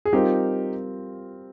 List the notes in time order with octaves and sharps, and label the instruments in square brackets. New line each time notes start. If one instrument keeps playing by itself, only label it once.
[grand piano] G#4
[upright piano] G3 C4 F4 A#4 [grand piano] D#4 G4